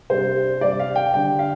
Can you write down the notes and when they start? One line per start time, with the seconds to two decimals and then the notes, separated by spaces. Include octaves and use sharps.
0.10 C3 G3 D4 C5
0.61 C3 G3 D4 D5
0.79 F5
0.96 G5
1.14 D3 G3 D4 G5
1.39 F5